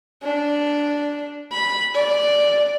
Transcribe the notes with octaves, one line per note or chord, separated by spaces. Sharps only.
D4
B5
D5